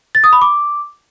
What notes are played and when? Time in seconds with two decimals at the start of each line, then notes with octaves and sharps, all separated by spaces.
0.15 A6
0.24 D#6
0.33 B5
0.42 D6